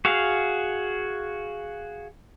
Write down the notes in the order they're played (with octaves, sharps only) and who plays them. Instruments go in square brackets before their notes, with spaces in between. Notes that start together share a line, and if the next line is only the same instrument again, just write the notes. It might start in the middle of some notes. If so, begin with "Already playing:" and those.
[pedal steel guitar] F#4 G#4 F5